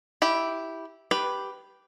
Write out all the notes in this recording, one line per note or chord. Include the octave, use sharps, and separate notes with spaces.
E4 G4
G4 B4